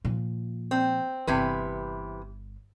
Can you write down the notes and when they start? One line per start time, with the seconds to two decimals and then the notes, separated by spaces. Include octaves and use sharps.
0.05 A#2 F3
0.71 C4
1.27 G1 C3 E3 B4